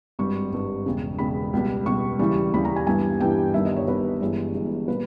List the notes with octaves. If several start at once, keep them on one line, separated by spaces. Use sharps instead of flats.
G#1 G2 G3 C#6
G#1 G2 G3
E1 E2 C#3
E1 E2 C#3 B5
C#2 B2 G3
C#2 B2 G3 C#6
D#2 C#3 E3 G3
D#2 C#3 E3 G3 B5
A#5
G#5
G1 G2 E3 G3 G#5
G1 G2 E3 G3 G5
G1 G2 D#3 G3 E5
D#5
C#5
G1 G2 D#3 G3 B4
G1 G2 E3 G#3 C#5
G1 G2 E3 G#3
A#2 G3 B4